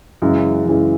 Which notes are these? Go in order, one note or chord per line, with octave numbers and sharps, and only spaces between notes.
F#2 C#3 E3 G#3
F#2 C#3 E3 G#3